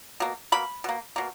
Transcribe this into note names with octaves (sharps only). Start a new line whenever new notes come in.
B2 A#3
B2 A#3 B5
B2 A#3
B2 A#3